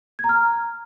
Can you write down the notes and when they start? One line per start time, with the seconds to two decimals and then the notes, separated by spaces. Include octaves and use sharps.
0.19 G#6
0.24 A#5
0.29 F6